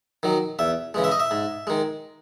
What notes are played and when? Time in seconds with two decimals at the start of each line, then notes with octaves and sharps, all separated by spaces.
0.23 D#3 F#3
0.59 E2 E5
0.94 C#3 E3 G#3
1.04 E5
1.11 D#5
1.20 E5
1.31 G#2
1.67 D#3 G#3